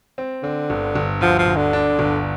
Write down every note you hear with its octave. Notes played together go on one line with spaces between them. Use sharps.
C4
D3 C4
G1
G1
D2 F3
F3
D2
D3
D4
G1